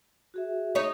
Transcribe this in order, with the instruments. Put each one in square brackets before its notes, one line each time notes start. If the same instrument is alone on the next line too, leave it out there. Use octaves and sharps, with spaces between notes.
[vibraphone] F#4 G#4 E5
[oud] D#4 C#5